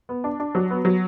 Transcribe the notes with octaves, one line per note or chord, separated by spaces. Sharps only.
B3
D4
D4
F#3
B3
F#3